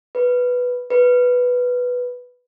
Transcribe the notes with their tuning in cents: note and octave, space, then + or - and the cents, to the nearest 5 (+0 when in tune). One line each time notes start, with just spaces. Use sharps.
B4 +0
B4 +0